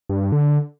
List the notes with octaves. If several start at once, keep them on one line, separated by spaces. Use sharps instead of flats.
G2
G2
D3